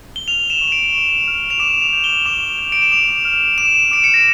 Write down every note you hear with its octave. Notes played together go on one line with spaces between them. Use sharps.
G7
F6 F7
E7
C#6
D7
C#6
F6
F7
D6 E7
F7
G6
G7
D6 F7
G6
D7
E7
D6 F7
F6
D6 E7
D6 D7
C#7
A#6